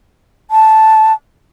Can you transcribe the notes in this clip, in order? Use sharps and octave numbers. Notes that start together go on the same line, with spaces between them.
A5